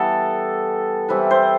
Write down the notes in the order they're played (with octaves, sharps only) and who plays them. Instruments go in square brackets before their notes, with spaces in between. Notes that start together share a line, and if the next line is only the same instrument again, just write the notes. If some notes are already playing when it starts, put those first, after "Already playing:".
Already playing: [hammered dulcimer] E3 G3 B3 A4
E3 G3 C4 E4 B4
C5